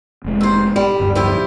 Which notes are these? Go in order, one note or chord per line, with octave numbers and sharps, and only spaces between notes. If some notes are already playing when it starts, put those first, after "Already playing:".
F1 G#3
D#2 C5
G3
D1 G2
F3 E4 G4